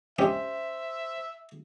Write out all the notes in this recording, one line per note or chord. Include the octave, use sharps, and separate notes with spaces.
G#3 C#4 G4 C5 E5